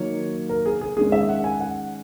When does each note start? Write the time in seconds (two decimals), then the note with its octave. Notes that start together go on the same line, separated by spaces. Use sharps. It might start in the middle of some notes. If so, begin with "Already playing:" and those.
Already playing: D#3 F#3 A#3 C#5
0.49 A#4
0.66 G#4
0.81 G#4
0.97 D#3 G#3 C#4 G#4
1.12 E5
1.29 F#5
1.44 G#5
1.61 F#5